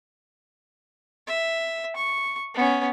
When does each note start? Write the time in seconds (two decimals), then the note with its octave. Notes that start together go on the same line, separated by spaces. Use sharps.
1.27 E5
1.96 C#6
2.54 B3 C#4